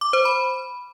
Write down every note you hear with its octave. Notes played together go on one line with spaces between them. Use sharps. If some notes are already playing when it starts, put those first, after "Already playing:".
D6
C5
B5